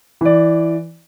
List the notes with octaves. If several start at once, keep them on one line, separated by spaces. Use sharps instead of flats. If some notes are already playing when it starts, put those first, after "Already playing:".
E3 D5